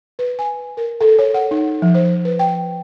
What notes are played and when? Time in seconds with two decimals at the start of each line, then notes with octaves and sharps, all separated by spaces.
0.19 B4
0.39 G#5
0.77 A#4
1.01 A4
1.19 C#5
1.34 F#5
1.51 D#4
1.82 F3
1.95 C5
2.25 B4
2.39 G5